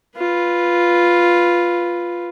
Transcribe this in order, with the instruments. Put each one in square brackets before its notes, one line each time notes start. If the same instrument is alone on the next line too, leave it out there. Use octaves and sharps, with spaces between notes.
[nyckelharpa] F4 B4